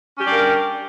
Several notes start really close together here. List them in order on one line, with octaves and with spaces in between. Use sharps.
C#4 G4 D4 G3 A#4